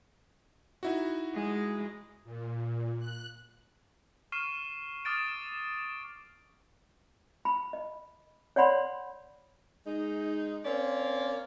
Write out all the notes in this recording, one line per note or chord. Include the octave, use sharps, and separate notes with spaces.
D#4 E4 F#4
G#3
A#2
F#6
C#6 F6 C7 D#7 E7
D6 D#6 F6 A6 D7
B5
D#5
C#5 D5 F#5 B5 C6
G#3 D#4
A#3 C4 C#4 A#4 D5